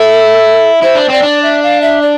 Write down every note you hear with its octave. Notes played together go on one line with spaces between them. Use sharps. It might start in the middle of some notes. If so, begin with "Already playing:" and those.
Already playing: E4 A4
E4 C5
D4
C4 D5
D4
E5
F5
E5
D5